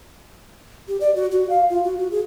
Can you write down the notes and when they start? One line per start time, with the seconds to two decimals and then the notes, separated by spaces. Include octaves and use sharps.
0.88 G4
1.01 D5
1.15 F#4
1.32 F#4
1.49 F5
1.70 F4
1.84 F#4
1.98 F#4
2.11 G#4